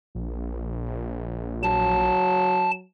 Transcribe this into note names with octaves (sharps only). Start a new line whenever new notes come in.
A#1
F#3 A5